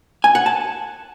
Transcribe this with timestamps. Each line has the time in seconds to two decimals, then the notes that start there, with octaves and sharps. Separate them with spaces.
0.24 G#5
0.35 F#5
0.46 A5